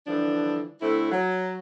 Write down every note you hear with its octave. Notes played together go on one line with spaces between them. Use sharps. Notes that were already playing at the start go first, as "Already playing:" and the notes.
D3 E3 F3 G3 D4
D3 A3 C4 E4
F#3